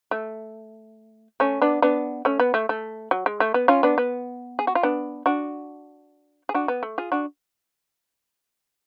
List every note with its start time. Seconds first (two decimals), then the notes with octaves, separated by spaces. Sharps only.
0.11 A3
1.40 A3 C#4
1.61 B3 D4
1.82 B3 D4
2.25 A3 C#4
2.39 B3
2.54 A3
2.69 A3
3.11 F#3
3.26 G#3
3.40 A3
3.54 B3
3.68 C#4 F4
3.83 B3 D4
3.98 B3
4.59 G#4
4.67 F#4
4.75 F4
4.83 B3 D4
5.26 D4 F#4
6.49 G#4
6.54 D4 F#4
6.68 B3
6.83 A3
6.98 F4 G#4
7.12 D4 F#4